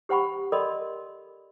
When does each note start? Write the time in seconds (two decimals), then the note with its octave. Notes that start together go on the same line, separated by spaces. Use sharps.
0.09 G4 C5 F#5 B5 C#6
0.52 A4 A#4 D5 D#5 B5 C6